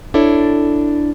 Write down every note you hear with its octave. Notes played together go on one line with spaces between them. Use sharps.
D4 E4 A4 C#5